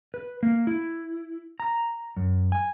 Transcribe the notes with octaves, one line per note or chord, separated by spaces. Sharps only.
B4
A#3
E4
A#5
F#2
G#5